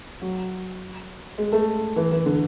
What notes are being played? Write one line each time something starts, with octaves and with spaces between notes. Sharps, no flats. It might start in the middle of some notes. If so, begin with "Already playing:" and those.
F#3
G#3
A3
E3
E3
D3